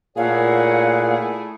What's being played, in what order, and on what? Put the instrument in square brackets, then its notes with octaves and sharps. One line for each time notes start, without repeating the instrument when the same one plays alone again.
[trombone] A#2 [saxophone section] A3 E4 G#4 [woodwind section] A#4 C#5 F#5 [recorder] F5